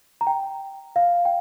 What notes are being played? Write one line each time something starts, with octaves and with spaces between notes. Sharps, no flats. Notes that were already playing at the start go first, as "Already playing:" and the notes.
A#5
G5
F5
G5